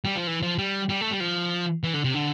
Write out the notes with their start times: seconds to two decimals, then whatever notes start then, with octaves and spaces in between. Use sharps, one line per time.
0.05 G3
0.16 F3
0.27 E3
0.42 F3
0.58 G3
0.89 G3
1.01 A3
1.11 G3
1.20 F3
1.84 E3
1.94 D3
2.04 C3
2.14 D3